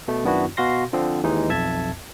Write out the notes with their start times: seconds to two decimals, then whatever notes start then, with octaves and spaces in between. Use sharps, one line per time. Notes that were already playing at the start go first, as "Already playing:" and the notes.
0.08 B2 A3
0.24 F#2 D#3 B3 D4 E4 F#4
0.57 B2 F#4 F5 C6 A#6
0.93 D3 F3 C4
1.23 D#2 E3 G#3 D#4
1.49 B1 F2 E5 A5 G#6